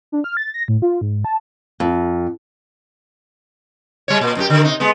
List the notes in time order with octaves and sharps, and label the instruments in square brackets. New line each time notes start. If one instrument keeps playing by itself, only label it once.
[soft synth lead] D4
F6
A6
A#6
A2
F4
G#2
A5
[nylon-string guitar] F2
[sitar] G3 C#5
A#2
F#2 C4 G4
D3 D#3
C3 D#4
G#3 B3